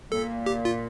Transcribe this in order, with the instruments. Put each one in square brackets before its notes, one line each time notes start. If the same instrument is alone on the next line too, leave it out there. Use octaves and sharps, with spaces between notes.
[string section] A#2 [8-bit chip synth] A4
[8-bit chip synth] G4
F4